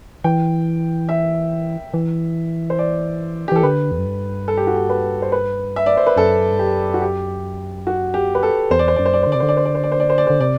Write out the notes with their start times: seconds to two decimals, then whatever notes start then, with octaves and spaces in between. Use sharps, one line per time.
0.24 E3 G5
1.09 E5
1.94 E3
2.70 C5
2.79 D5
3.48 G4
3.52 E3 A4
3.63 D3 B4
3.91 E2
3.98 F#2
4.06 G2
4.48 A4
4.57 G4
4.67 F#4
4.77 G4
4.90 B4
5.22 C5
5.32 B4
5.76 E5
5.86 D5
5.97 C5
6.07 B4
6.17 F#2 A4
6.52 G2
6.59 F#2 G4
6.94 F#4
7.02 G4
7.87 F#4
8.14 G4
8.35 B4
8.43 A4
8.71 E2 C5
8.79 D5
8.88 C5
8.96 F#2 D5
9.05 C5
9.13 D5
9.23 C5
9.27 D3
9.32 C3 D5
9.40 D3 C5
9.49 D5
9.57 C5
9.65 D5
9.75 C5
9.83 D5
9.92 C5
10.00 D5
10.10 C5
10.18 D5
10.27 D3 C5
10.40 C3 D5